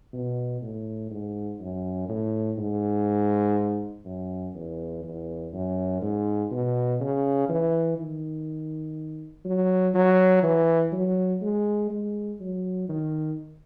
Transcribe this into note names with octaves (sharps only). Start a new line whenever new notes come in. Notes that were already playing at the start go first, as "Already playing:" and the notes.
B2
A2
G#2
F#2
A2
G#2
F#2
E2
E2
F#2
G#2
B2
C#3
E3
D#3
F#3
F#3
E3
F#3
G#3
G#3
F#3
D#3